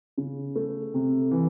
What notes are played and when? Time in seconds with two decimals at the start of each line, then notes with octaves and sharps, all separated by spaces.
0.18 C#3
0.55 A3
0.94 C3
1.31 E3